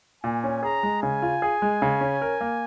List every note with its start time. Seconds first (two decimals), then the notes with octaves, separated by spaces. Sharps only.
0.23 A#2 G#5
0.44 C#4
0.63 G#4 A#5
0.83 G#3
1.02 C#3 G#5
1.22 F4
1.42 G#4
1.62 G#3
1.82 C#3
2.01 C#4
2.22 A#4
2.41 A#3